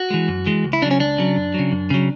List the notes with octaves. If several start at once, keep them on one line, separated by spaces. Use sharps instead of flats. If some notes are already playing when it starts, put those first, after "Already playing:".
Already playing: F#4
E3 G#3
F#2
E3 G#3
C#2
E4
C#3 F#3 D4
C#4
C#2 D4
C#3 F#3
F#2
C#3 F#3
F#2
C#3 F#3